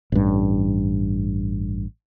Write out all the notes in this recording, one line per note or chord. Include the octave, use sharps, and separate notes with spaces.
A1 G2